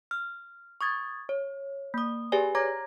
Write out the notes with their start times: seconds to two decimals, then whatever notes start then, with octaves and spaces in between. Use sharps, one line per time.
0.11 F6
0.81 C#6 D#6 G#6 A6
1.29 C#5
1.94 A#3 D#6
2.32 G4 G#4 B4 D5 G#5
2.55 C#5 A#5 D6 G#6 A#6